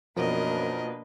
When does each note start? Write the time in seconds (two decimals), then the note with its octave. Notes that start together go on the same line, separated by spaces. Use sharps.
0.16 F#2 B2 F3 A#3 D4 A#4 B4 D#5